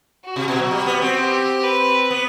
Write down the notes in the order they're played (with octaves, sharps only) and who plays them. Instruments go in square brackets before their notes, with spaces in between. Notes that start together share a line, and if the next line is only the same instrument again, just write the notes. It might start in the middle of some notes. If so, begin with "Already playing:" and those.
[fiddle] F#4
[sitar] C3
B2
F#3
G3
B3
C4
[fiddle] G4
B4
[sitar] B3